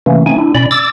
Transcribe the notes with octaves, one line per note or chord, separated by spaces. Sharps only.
C3 E3 A3 A#3 C#4
A3 C4 C#4 D#4 G#5
D4 E4
B2 C#4 D5 B5
D6 E6 A6